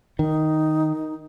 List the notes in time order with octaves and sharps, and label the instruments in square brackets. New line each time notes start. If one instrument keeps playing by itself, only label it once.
[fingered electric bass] D#3 [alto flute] D#4